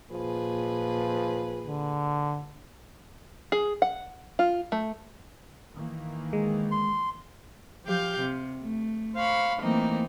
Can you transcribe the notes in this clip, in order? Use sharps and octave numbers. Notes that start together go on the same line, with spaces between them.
A#2 F3 G#4 B4
D3
G#4
F#5
F4
A3
D#3 E3 A#3
G#3
C6
F3 G4 F5 G6
C3
A3
C5 F5 B5 C#6
E3 A3 A#3 C4 D#4